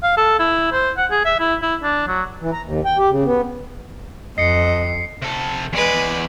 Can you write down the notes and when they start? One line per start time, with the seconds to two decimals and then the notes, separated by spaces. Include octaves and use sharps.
0.03 F5
0.17 A4
0.39 E4
0.72 C5
0.97 F#5
1.11 G#4
1.25 E5
1.40 E4
1.62 E4
1.83 D4
2.08 F#3
2.41 E3
2.52 A#5
2.64 D#2
2.85 G5
2.98 G4
3.10 C#3
3.25 B3
4.38 F2 D#5 C7 C#7
5.22 C3 A4
5.73 E2 G#3 B4 D5